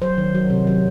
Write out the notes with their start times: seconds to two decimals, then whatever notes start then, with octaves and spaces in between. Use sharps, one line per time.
0.02 F#3 C5
0.18 D#3
0.35 F#3
0.50 C3
0.67 F#3